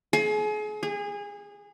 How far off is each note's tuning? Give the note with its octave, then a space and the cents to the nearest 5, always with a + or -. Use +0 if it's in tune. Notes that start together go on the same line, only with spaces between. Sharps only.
G#4 +35
G#4 -25